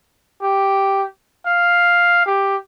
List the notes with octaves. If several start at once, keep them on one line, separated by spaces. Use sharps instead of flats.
G4
F5
G4